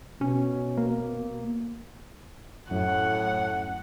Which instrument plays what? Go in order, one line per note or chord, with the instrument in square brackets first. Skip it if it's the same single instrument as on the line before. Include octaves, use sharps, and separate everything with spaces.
[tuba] B2 [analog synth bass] C#4
[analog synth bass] A#3
[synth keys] F#2 [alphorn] A2 [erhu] F#5